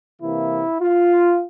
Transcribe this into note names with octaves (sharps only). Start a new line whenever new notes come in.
C3 E3 A#3 E4
F4